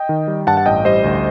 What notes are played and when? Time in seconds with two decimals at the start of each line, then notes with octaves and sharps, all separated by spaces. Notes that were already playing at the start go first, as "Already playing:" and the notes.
Already playing: D#5 G5
0.09 D#3
0.28 G3
0.47 G2 F#5 A5
0.57 F#5
0.66 A1 D#5 G5
0.85 G3 C5 D#5
1.04 D2